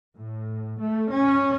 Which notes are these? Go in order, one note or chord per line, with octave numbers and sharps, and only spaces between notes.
A2
A3
C#4